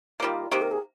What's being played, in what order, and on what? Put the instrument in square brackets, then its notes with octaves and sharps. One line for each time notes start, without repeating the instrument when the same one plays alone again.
[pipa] D#3 G3 A#3 [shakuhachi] F4
[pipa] C3 D#3 A#3 [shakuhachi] G4
[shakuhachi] A#4
G#4